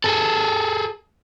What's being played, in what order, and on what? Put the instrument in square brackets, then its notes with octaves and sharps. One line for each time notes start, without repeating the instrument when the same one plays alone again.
[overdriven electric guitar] G#4 A4